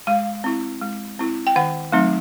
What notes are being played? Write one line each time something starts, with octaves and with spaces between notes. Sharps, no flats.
G#3 F5
C4 E4
G#3
C4 E4
G5
D#3 F#5
F#3 A3 C4 D#4